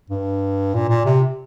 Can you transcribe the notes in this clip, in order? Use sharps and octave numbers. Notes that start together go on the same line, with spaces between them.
G2
A#2
A#2
C3